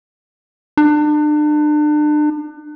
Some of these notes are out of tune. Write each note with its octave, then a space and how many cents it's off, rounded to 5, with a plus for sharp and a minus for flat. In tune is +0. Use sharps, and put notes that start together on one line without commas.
D4 +35